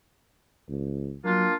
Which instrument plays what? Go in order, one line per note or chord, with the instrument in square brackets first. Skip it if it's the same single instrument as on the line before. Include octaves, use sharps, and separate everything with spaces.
[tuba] C#2
[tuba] F#3 [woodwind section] A#3 D4 F4